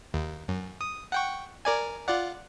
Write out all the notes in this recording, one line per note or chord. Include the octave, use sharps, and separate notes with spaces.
D#2
F#2
D#6
F#5 G5 C#6
A#4 D5 G#5
F4 D5 F#5